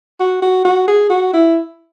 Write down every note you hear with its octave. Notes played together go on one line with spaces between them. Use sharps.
F#4
F#4
F#4
G#4
F#4
E4